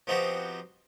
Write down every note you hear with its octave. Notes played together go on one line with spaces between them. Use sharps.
F3 B3 C4 D#4 F#4 G4